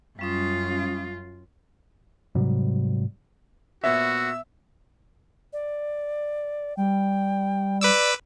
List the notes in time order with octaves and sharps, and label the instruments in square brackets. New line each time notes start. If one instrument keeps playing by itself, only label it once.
[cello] F#2 F4 [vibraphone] G3 C#4 D#6
[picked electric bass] G#2 C3 F#3 G3
[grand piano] A#2 B3 C#5 [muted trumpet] F#4 [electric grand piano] E5 [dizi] E6
[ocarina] D5
[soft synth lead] G3 [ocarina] G5
[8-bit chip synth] B4 D6 E6 [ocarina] D5